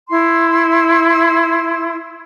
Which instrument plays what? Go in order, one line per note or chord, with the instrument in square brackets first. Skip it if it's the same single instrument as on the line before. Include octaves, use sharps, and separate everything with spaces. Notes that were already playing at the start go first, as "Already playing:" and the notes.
[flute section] E4 C6